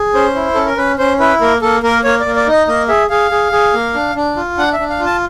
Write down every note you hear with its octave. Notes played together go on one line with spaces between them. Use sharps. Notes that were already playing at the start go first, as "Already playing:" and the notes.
Already playing: G#4
C#4 C5
E4
C#4 A4
A#4
C#4 B4
C#4 C5
E4 B4
A#3 A#4
A#3 A4
A#3 A#4
A#3 C#5
D5
A#3
D5
D#4 D#5
A#3 D#5
G#4 E5
G#4 F5
G#4
G#4
A#3
D4
D4
F4
D4 F#5
E5
D4
F5
F4
A5